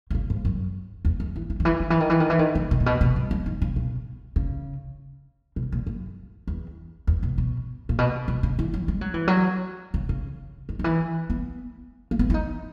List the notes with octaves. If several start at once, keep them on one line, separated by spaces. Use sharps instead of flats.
B2
C#3
G#2
F#2
E2
F#2
E3
E3
D#3
E3
D#3
E3
D#3
E3
D#3
E3
D#3
C#3
B2
A#2
B2
B2
G#2
F#2
D#3
C#3
B2
C#3
B2
A#2
F#2
E2
E2
B2
B2
A#2
B2
B2
C#3
E3
F#3
G#3
F#3
E3
F#3
C#3
C#3
D#3
D#3
E3
B3
A#3
B3
E4
D#4